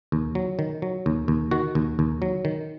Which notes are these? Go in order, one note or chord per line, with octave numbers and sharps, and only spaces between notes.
D#2
F#3
D#3
F#3
D#2
D#2
D#3 F#4
D#2
D#2
F#3
D#3